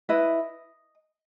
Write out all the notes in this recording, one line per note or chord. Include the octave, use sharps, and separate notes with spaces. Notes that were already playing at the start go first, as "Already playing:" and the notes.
E4 B4 D#5